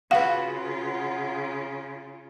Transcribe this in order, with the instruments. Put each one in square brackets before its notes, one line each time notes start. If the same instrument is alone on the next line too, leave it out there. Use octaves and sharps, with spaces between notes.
[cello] C#3 F4 [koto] F#4 B4 [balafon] F5 [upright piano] F#5